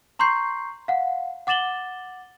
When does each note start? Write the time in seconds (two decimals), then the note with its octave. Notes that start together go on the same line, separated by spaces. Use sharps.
0.19 A#5 C6 C#6 G6 C7
0.88 F5 F#5
1.47 F#5 D6 A6 E7 F#7 G7